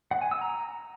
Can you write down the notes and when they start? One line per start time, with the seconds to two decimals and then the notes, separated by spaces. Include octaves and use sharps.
0.11 F#5
0.21 G#5
0.31 E6
0.41 A#5